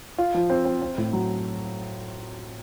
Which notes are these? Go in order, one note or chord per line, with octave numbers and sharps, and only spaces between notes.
F4
F3
C4
C4
C4
A2
F#3